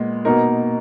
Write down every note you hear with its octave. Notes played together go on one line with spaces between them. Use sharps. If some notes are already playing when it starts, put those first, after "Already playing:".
Already playing: A#2 G#3 B3
B2 A#3 D#4 A#4